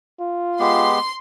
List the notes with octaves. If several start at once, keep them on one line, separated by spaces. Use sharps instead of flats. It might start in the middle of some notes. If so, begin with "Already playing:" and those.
F4
G#3 B3 G4 C6